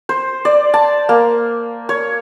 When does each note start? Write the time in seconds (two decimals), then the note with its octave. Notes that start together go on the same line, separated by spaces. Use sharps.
0.09 C5
0.45 D5
0.74 A5
1.09 A#3
1.89 C#5